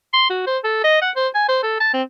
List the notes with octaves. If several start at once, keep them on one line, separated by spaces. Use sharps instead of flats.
C6
F#4
C5
A4
D#5
F#5
C5
G#5
C5
A4
A5
C4